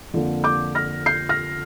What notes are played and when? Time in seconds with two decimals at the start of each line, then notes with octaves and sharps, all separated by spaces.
0.14 F2 D3 A#3
0.44 D6 G6
0.75 F6 A#6
1.06 G6 C7
1.29 F6 A#6